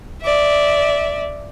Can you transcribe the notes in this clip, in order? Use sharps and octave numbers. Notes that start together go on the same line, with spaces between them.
D5 E5